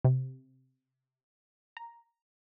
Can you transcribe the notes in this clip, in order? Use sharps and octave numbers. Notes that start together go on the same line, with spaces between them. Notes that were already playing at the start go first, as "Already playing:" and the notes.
C3
A#5